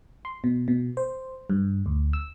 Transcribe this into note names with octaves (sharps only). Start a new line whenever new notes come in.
C6
B2
B2
C5
G2
D2
E6